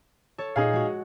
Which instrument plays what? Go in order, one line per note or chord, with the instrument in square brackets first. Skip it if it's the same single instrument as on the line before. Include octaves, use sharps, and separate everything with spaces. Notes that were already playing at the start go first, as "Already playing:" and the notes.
[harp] A4 C#5
[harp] A#2 [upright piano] D#4 G#4 F5
[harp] G#3 F#4